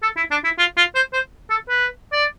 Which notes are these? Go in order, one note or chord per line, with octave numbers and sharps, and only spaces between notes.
A4
E4
D4
E4
F4
F4
C5
C5
A4
B4
D5